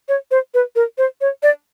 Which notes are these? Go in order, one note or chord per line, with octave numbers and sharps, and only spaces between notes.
C#5
C5
B4
A#4
C5
C#5
D5